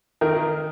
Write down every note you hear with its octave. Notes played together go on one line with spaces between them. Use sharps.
D#3 A#4